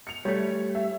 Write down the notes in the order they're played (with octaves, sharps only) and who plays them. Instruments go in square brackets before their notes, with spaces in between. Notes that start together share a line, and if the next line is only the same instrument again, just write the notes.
[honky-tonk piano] C#7 F7
[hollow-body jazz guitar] G3 A3 [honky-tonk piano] C#5
[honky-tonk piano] E5